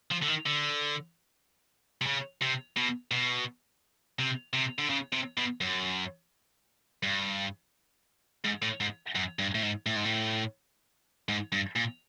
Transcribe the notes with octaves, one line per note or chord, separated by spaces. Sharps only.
F3
D3
D#3
D3
C3
C#3
C3
B2
B2
C3
C3
D3
C#3
C3
B2
F#2
G2
G#2
A2
G#2
F#2
G2
A2
G#2
A2
G#2
A2
G#2
G2
A#2